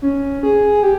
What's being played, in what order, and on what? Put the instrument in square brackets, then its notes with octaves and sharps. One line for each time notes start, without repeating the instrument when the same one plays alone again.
[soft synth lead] C#4
G#4
G4